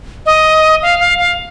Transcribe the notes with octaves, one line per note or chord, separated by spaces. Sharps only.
D#5
F5
F5
F5